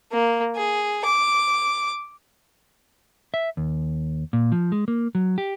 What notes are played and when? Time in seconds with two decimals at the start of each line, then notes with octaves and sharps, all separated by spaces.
0.12 A#3
0.56 G#4
1.05 D6
3.34 E5
3.57 D#2
4.33 A#2
4.52 F3
4.72 G#3
4.88 A#3
5.15 F#3
5.38 G4